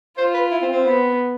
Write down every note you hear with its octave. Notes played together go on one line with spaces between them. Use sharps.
F4 C5
B4
E4
C4
C4
B3